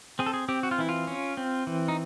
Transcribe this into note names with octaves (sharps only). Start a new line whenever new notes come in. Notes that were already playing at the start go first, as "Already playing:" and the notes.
C4 G#4
A4
G#4
C4 G4
F#4
F4
E3 E4
F4
C#4
C4
E3
D#4